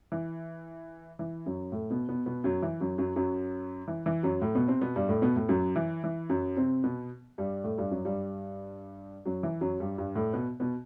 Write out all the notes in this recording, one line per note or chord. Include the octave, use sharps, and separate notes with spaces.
E3
E3
F#2 F#3
A2 A3
B2 B3
B2 B3
B2 B3
F#2 F#3
E3
F#2 F#3
F#2 F#3
F#2 F#3
E3
E3
F#2 F#3
A2 A3
B2 B3
C3 C4
B2 B3
G2 G3
A2 A3
B2 B3
A2 A3
F#2 F#3
E3
E3
F#2 F#3
C3 C4
B2 B3
G2 G3
A2 A3
G2 G3
F#2 F#3
G2 G3
F#2 F#3
E3
F#2 F#3
G2 G3
G2 G3
A2 A3
B2 B3
B2 B3